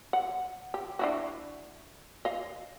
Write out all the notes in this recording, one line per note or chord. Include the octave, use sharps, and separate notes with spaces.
F#5
G4
D4 E4 F#4
D#5 F5